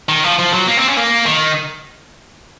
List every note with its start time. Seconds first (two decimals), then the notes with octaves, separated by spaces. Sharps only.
0.09 D#3
0.23 F3
0.38 F3
0.53 F#3
0.67 A#3
0.77 C4
0.87 C#4
0.97 A#3
1.26 D#3